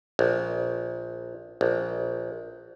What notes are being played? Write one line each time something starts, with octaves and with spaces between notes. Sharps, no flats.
A#1
A#1